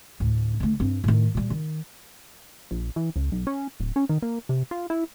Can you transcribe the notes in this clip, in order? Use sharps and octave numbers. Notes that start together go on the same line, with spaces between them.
D2 A2
D3 A3
G2 C4
A2 D#3
A#2 G3
D#3
A#1
E3
C#2
B1
C#4
D1
C#4
D#3
A#3
C3
F4
E4